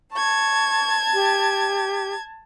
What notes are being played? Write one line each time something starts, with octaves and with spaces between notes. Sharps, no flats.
A5 C#6 G#6
G4